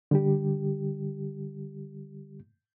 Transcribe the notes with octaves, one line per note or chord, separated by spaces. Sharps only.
D3 G3 G4